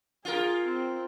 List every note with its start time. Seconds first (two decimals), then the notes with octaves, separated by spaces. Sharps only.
0.25 F4 G#4 A#4
0.65 C4